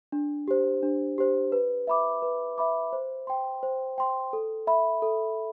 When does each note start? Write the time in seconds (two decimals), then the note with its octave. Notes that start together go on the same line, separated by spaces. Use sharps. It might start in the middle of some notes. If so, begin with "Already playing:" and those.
0.12 D4
0.48 G4 C5
0.83 D4
1.18 G4 C5
1.52 B4
1.87 E5 B5 D6
2.22 B4
2.58 E5 B5 D6
2.93 C5
3.27 G5 C6
3.63 C5
3.98 G5 C6
4.33 A4
4.67 E5 B5
5.02 A4